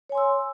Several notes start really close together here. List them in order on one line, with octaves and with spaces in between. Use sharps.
C#5 G#5 C6 E6